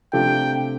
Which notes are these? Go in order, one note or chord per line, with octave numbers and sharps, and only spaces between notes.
C3 F3 A3 D4 G4 G5